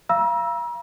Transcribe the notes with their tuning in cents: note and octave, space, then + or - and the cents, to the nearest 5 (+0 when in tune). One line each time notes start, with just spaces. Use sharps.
F5 -30 A#5 +40 E6 +0